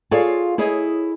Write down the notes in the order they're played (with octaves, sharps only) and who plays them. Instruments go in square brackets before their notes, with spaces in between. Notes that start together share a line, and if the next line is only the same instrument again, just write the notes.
[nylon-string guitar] F4 G#4 A4 C#5 D5 F5
E4 G#4 C#5 D#5